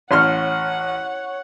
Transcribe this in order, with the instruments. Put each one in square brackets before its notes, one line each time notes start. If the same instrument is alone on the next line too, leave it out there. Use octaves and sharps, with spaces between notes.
[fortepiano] A1 C6 F6 [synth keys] C#5 [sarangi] F#5